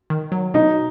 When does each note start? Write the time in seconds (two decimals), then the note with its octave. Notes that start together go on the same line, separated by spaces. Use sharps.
0.10 D#3
0.32 F#3
0.54 B2 D#4